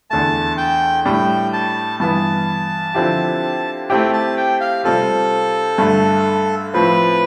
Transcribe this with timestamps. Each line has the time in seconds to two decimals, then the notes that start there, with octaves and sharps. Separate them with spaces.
0.10 E2 D3 A3 A5
0.58 G5
1.05 A2 G3 D4 G5
1.53 A5
2.00 G2 E3 B3 A5
2.94 D3 F3 C4 E4 G4
3.89 A3 C4 E4 G4 G5
4.13 A5
4.37 G5
4.60 F5
4.84 C3 G3 C4 F4 A4
5.78 G2 D3 A3
6.74 A2 F3 C4 B4